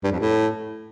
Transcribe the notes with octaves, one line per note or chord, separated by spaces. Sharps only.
G2
F2
A2